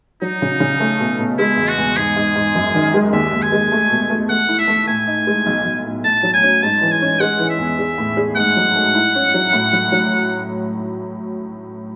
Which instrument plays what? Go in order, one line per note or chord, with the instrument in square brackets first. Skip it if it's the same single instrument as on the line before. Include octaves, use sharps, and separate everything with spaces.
[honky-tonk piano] F#3 [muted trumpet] D#4
[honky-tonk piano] C#3
C#3
A3
B2
B2
[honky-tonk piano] G#3 [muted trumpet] E4
[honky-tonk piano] E2
[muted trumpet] F#4
[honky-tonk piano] E2
[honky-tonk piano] G#2 [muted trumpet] G#4
[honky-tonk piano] G#2
G#2
F#2
D#3
G#3
[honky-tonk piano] D#2 [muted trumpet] E5
[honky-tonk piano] D#2
[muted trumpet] G#5
[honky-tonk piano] G#3
A3
B2
A3
[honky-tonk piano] A3 [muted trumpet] F#5
[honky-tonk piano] E4
[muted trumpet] E5
[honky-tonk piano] A3
[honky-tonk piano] A2 [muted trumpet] G#5
[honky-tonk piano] D#4
G#3
B1
B1
A2
[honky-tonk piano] A2 [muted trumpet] A5
[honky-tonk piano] F#3
[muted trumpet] G#5
[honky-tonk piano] C#4
[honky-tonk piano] G#2 [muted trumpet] A5
[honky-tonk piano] E3
[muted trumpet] G#5
[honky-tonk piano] C#4
[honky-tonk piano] G#3 [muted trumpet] F#5
[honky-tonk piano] E3
[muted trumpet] E5
[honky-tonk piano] E2
G#4
A2
G#4
[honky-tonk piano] G#2 [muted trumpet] F#5
[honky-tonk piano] F#3
A3
E4
C#4
F#3
A2
F#3
F#3